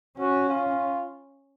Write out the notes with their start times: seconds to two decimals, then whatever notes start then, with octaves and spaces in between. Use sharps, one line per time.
0.19 C#4 F#4
0.49 F4